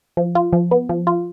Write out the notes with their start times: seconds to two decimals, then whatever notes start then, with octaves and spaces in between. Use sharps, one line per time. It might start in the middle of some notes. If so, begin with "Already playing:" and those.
0.17 F3
0.35 F4
0.53 F3
0.71 B3
0.89 F3
1.07 F4